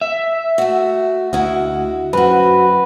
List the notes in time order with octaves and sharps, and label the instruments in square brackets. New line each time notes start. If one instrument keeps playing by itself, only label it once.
[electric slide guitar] E5
[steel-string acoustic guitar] A3 F#4
[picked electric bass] D2 [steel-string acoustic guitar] E4 F#4 D#5 [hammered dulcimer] F#5
[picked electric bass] F#2 [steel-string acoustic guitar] C4 F#4 [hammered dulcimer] B4